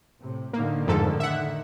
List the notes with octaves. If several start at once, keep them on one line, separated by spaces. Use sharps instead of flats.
A2 C3
A2 D3 D#3 A#3
F2 G#2 A4
E5 F#5